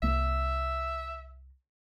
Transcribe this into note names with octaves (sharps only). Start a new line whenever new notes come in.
C2 A#3 E5